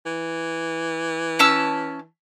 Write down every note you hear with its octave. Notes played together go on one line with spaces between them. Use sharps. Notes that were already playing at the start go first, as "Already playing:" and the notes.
E3
C#4 A5 E6